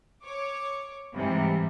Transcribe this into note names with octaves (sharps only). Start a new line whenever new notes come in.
C#5 D6
G#2 C3 E3 G3